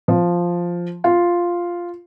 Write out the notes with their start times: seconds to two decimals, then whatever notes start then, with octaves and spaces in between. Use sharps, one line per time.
0.08 F3
1.04 F4